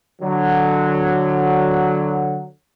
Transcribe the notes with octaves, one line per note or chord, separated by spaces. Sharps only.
D3 F#3